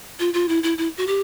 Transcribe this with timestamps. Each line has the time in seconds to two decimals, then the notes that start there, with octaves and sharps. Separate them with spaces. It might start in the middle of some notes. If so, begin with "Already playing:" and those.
0.20 F4
0.34 F4
0.48 E4
0.63 E4
0.78 E4
0.97 F#4
1.07 G4